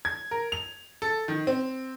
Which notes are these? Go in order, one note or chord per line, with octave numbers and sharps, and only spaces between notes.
G#6
A#4
F7
A4
D#3
C4